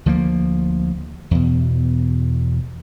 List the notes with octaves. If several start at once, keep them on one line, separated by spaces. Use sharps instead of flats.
D2 F3 G#3 A#3
E2 B2